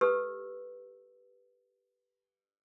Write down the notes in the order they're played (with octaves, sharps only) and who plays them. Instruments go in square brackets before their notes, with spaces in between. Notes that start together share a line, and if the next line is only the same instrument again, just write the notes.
[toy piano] G4 A4 B4 E6